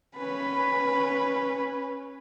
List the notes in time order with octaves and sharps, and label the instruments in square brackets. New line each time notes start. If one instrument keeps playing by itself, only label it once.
[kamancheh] C#4 B4 [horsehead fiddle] B5